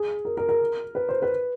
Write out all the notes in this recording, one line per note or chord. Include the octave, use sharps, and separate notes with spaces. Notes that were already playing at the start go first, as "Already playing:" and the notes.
Already playing: G#4
A#4
A#4
A#4
B4
C5
B4